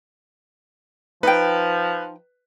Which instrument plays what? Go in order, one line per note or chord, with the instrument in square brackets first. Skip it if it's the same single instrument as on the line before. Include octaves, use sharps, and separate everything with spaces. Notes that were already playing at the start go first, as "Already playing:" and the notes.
[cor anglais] F3 [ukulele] D#4 G5 [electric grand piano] B4